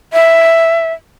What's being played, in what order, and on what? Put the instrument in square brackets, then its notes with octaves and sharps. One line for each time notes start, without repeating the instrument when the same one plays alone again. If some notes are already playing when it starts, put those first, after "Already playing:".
[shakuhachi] E5